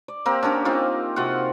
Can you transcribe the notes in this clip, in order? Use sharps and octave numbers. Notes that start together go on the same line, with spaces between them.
D5
A#3 C4 G4 A#4
C#4 D4 G4 A#4
C4 D#4 F4
C3 F4 F#4 F#5